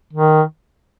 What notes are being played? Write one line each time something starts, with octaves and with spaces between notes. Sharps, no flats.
D#3